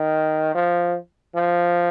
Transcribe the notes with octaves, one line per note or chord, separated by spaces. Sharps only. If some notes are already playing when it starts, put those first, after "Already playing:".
Already playing: D#3
F3
F3